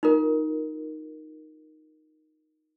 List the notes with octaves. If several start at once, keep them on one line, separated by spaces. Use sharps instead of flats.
D#4 F4 A#4